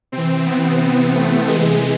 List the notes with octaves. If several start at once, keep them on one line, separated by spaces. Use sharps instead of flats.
C3 E3 C4
B3
A3
C3 E3 G#3